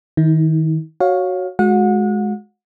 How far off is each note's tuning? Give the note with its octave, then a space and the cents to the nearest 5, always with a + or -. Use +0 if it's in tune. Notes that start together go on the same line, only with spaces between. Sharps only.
D#3 +20 E4 -40
F#4 +0 C#5 +0 F5 +20
G#3 +15 F#4 -20 F#5 -35